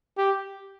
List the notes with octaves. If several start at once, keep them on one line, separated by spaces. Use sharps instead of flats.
G4